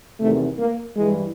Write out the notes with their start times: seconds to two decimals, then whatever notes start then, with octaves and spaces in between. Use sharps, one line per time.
0.20 E2 C3 D#3 A3
0.59 A#3
0.97 G2 E3 G#3